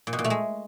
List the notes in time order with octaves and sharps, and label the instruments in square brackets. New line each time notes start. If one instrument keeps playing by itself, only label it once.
[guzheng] A#2
B2
A#2
A3
G#3